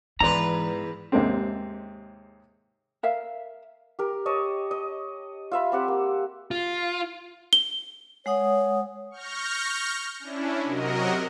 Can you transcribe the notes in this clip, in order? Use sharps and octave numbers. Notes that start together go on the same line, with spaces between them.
E2 G#2 E3 B4 D5 A#5 C6
D#2 G#2 C3 G#3 A#3 C4
A#4 E5 F5
G4 A#4
C#5 D#5 A5
D#5
F4 E5 B5
C4 G4 F#5
A#3
F4
G7
G#3 C#5 F#5 D#6
C#6 F6 G6 A#6
C#4 D4 E4
C3 F#3 F#4 A#4 D#5